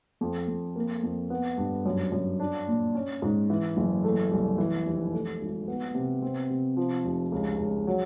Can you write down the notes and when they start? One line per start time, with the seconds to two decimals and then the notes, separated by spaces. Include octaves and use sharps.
0.21 F2
0.48 F2
0.76 A#3
1.03 F2
1.30 B3
1.58 G2
1.86 F#2
2.12 F#2
2.40 D4
2.68 A#2
2.95 C#4
3.22 G#2
3.50 E3
3.77 F#1
4.04 A3
4.31 C2
4.58 E3
4.86 F1
5.13 A3
5.41 G#1
5.68 B3
5.95 C3
6.22 C4
6.50 C3
6.77 F3
7.05 F1
7.32 C#2
7.59 C#2
7.87 F#3